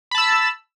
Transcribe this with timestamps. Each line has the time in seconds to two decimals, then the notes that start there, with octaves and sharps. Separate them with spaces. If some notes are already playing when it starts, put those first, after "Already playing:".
0.11 B5
0.15 A5
0.18 E6